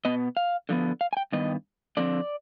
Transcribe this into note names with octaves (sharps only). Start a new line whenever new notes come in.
B2 B3 D#5
F5
D3 F3 B3
F5
G#5
G5
G2 D#3 B3 D#5
D3 F3 C4 D5